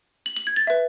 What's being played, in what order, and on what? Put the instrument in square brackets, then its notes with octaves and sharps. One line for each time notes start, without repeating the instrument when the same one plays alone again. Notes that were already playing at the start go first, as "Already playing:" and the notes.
[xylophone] F#7
F#7
G#6
A6
B4 E5